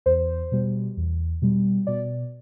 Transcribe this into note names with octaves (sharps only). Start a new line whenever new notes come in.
E2 C5
B2 G3
E2
B2 G3
B2 D5